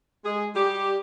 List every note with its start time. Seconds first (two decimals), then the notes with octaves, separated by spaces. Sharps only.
0.24 G#3 G#4
0.54 G3 G4